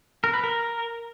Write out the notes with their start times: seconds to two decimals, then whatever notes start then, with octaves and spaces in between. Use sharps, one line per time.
0.24 A#4
0.34 B4
0.43 A#4